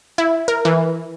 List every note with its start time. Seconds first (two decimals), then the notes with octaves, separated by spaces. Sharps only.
0.18 E4
0.48 A#4
0.65 E3